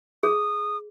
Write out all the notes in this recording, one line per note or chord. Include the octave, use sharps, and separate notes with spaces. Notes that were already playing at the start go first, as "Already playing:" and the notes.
G#4 D#6